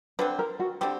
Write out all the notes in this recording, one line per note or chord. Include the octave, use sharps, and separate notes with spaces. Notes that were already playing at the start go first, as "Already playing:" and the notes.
D3 G3 C4 B4
A#4
F#4
D3 G3 C4 G4